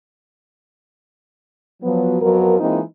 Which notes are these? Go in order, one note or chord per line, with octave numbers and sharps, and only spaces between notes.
F3 F#3 B3
F2 F3 F#3 B3 A#4
E3 G#3 A#3 C4 D#4 F4